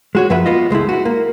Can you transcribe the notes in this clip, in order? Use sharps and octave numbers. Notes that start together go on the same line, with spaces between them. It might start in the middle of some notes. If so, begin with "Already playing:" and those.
G#3 F#4 C#5
F#2 F3 B4 E5 F#5
B3 F4 D#5
C#2 G#3 A3 E4
E4 F#4
A#3